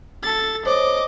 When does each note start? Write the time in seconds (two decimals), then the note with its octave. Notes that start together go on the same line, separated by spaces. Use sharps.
0.23 A4 A6
0.66 C5 C#5 D#5 D6